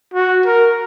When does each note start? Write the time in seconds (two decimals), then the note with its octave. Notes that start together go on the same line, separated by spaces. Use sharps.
0.14 F#4
0.46 A#4